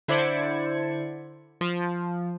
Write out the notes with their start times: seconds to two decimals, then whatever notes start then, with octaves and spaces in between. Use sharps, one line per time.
0.08 D3 E4 C5 D5 G#6 C#7
1.61 F3